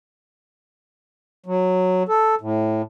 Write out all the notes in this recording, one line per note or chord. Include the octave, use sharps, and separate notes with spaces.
F#3
A4
A2